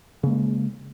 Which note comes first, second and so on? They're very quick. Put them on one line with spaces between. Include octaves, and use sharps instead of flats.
C#3 A#3 G#3